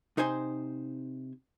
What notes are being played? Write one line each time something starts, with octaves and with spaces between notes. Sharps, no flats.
C3 D#4 C5 G#5 C6